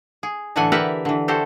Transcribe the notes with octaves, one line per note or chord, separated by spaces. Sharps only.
G#4
A2 D3 E3 A4 F#5 G#5
G4 A#4 B4 D5 E5 F#5
D3 E3
F#4 G4 A4 C5